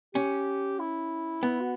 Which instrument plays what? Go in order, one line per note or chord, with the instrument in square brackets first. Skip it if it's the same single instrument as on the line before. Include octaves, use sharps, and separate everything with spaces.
[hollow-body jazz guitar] C#4 [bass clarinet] G4
[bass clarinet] E4
[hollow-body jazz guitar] B3 [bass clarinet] E4
[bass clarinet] F#4